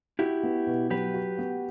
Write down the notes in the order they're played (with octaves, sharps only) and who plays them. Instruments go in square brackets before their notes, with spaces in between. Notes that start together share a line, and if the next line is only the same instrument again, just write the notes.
[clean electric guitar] E4 G4 [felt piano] F#4
[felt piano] B3
B2
[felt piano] F#3 [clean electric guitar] G4 B4
[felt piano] F#4
B3